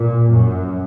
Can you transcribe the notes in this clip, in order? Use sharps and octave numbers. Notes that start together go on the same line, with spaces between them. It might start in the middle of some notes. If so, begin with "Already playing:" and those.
Already playing: A#2
F#2